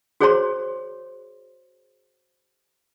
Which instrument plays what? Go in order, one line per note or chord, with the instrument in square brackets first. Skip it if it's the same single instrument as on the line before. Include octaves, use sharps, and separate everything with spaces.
[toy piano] F#4 G#4 C5 C#5 A#5 C6